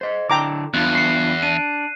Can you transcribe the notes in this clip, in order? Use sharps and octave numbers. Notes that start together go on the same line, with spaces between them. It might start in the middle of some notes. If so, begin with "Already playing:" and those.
C5 D#5
D3 D4 E4 G5 A#5 D6
E2 B3 D4 F4 F#6
C7 C#7
D4 D#7